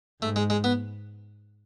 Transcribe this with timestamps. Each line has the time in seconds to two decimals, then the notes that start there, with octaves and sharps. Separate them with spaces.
0.22 G#2 A3
0.36 G#3
0.50 G#3
0.64 B3